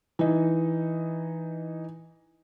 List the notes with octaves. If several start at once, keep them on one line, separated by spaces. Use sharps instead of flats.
E3 D#4